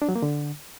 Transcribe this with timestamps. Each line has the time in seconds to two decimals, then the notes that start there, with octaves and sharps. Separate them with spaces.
0.02 D4
0.09 F#3
0.16 A#3
0.22 D3